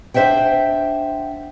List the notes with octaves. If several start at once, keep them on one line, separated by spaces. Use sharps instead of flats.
D4 C5 E5 F#5 G5